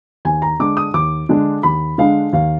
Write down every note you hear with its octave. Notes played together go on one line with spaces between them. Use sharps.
D#2 G#5
A#5
D3 G#3 D4 D6
D#6
D#2 D6
D3 G#3 D4
D#2 B5
D3 G#3 D4 F5
D#2 F5